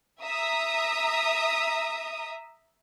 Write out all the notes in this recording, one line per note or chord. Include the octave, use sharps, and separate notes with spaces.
E5 A#5 D#6